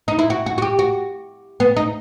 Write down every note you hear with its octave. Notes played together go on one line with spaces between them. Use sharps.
D#4
E4
F#4
F#4
F#4
G4
F#4
B3
D#4